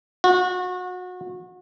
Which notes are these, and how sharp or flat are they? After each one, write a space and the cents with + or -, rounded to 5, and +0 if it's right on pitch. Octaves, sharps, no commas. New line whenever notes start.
F#4 -30